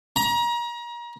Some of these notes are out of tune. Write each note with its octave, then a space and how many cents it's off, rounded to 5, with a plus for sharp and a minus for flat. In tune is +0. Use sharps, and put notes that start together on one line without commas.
A#5 +30